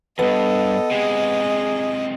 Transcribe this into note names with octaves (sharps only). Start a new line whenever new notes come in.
E2 G2 B3 A4 D#5
C3 G#3 G#4